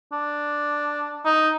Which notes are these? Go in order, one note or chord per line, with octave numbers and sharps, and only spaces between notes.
D4
D#4